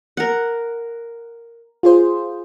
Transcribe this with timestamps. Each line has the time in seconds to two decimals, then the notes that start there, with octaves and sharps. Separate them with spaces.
0.17 A#4 F#5
1.83 F4 G#4 C5